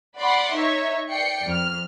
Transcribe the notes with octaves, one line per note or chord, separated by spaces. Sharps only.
D5 F#5 B5 C6 D6
D#4 C#5 E5
D5 G5 C7 C#7
F2 F6